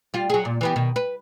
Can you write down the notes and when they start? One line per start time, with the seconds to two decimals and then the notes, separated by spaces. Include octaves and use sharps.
0.14 G3 F4
0.30 F#3 G#4
0.45 A#2
0.61 E3 B3 G4
0.76 B2 D#3
0.96 B4